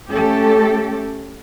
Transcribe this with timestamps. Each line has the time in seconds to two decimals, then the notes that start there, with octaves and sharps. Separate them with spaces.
0.11 A3 C#4 G4 A4